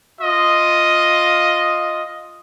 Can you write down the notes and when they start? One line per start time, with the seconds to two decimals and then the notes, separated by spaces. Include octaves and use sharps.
0.21 F4 D#5